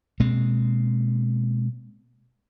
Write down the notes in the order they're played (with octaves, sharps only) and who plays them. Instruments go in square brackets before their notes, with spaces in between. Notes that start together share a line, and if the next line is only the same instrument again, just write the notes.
[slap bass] B2 G#3 A#3 C4